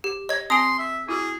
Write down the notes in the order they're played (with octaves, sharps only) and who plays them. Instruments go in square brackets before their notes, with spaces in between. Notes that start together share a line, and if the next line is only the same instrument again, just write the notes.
[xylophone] G4
[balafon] C#5 [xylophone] D#5 G#6
[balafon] C4 G#5 [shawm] C6 [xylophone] D#6 D7
[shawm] E5
[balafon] E4 F#4 [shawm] G#4